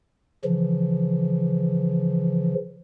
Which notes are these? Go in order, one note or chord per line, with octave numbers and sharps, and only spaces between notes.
C#3 E3 F3